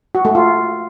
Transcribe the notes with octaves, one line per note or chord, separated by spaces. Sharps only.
F#4
A3
F4